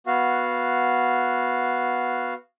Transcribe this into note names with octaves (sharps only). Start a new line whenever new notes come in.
B3 F#4 F5